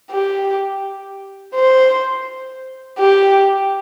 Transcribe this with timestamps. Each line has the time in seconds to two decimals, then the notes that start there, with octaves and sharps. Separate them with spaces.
0.11 G4
1.55 C5
2.99 G4